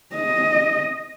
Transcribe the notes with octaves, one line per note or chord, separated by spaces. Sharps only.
D#5